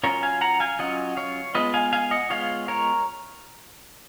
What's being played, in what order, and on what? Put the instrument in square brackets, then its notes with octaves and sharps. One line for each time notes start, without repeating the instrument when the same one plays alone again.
[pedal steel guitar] F#3 C#4 F4 A#4 C#5
F5 G#5
F#5 A#5
F5 G#5
F#3 C#4 F4 D#5 F#5
C#5 F5
G#3 B3 F4 B4 D#5
F5 G#5
F5 G#5
D#5 F#5
G#3 B3 F4 C#5 F5
A#4 C#5